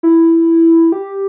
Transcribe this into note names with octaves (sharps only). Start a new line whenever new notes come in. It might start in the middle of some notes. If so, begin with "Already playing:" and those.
E4
G4